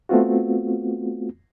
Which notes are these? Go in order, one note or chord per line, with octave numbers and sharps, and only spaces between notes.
A3 B3 C4 F4 F#4